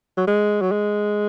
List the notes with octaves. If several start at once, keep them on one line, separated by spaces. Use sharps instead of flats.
F#3
G#3
F#3
G#3